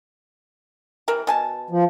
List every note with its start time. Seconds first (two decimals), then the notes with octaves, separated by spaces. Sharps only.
1.08 C3 E3 A#4
1.27 B2 G#5 A5
1.70 F3